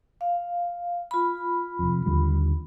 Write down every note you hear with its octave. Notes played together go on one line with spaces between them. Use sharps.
F5
F4 B5
F1 F2
D#2 D3 G3